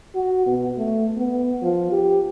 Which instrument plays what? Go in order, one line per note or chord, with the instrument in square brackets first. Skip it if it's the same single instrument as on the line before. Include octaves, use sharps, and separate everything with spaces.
[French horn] F#4
B2
A3
B3
F3
G4